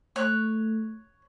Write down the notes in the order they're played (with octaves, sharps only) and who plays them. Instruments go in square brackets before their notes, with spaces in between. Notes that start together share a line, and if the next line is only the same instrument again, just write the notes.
[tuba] A3 [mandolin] C#5 F#6